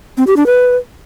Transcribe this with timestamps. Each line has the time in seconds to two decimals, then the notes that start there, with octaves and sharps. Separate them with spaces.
0.17 C4
0.27 G4
0.37 D4
0.46 B4